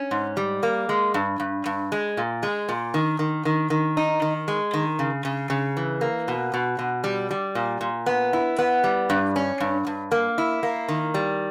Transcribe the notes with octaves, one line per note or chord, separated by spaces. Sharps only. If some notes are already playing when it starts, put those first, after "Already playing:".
Already playing: C#4
G#2
G3
A#3
G#3
G2
G2
G2
G#3
A#2
G#3
A#2
D#3
D#3
D#3
D#3
D#4
D#3
G#3
D#3
C#3
C#3
C#3
E3
A#3
B2
B2
B2
G3
G3
A#2
A#2
B3
E4
B3
G3
G2
C#4
G2
G2
A#3
E4
A#3
D#3
G3